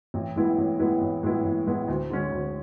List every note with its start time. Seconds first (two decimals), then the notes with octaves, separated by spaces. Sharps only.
0.14 A1
0.36 A2 G#3 B3 E4
0.58 A1
0.79 A2 G#3 B3 E4
1.02 A1
1.23 A2 G#3 B3 E4
1.45 A1
1.66 A2 G#3 B3 E4
1.88 D2
2.10 D3 G#3 C#4
2.32 D2